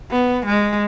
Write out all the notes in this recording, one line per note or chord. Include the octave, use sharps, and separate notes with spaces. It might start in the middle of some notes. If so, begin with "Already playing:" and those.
B3
G#3